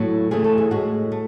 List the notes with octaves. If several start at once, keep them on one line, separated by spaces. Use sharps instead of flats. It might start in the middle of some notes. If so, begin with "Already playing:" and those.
Already playing: A2 F#3 A3
C#3 E3 A3 G#4
A4
G#4
A2 G#3 F#4
A3